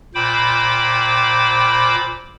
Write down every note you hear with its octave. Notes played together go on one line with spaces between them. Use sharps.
A#2 C5 G5 B5 D6